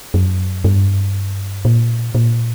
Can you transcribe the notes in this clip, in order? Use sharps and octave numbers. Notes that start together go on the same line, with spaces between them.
F#2
G2
A#2
A#2